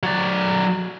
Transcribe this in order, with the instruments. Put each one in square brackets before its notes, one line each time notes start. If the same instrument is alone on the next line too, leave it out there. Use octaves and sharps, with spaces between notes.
[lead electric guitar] F#3 D5